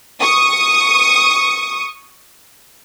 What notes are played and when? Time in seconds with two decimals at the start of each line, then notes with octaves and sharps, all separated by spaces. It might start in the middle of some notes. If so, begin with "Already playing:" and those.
0.20 C#6 D#6